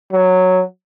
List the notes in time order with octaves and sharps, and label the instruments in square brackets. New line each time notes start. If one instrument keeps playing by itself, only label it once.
[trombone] F#3